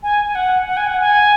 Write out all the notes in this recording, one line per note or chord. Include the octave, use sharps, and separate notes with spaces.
G#5
G#5
F#5
F#5
G#5
F#5
G#5